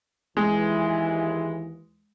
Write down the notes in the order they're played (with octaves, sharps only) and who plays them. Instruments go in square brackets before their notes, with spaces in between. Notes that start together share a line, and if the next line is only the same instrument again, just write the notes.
[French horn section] D#2 E3 [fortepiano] G#3